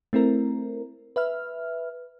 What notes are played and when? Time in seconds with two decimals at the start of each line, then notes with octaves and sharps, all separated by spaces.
0.13 A3 C4 E4 A#4
1.16 B4 E5 F6